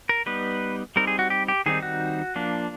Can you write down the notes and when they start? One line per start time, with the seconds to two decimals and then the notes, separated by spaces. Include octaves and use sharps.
0.09 A#4
0.26 G3 B3 D#4 B4
0.96 G3 C4 D#4 A#4
1.07 G#4
1.19 F#4
1.30 G4
1.48 G4
1.66 D#3 G3 C4 D#4 G#4
1.83 F#4
2.36 F3 A#3 D4